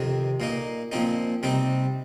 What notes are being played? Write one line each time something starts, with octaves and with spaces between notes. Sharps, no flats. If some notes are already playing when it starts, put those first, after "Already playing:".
Already playing: F2 C3 D#3
A#2 A#3 D#4
A#2 F3 C4 D#4
C3 G3 C4 D#4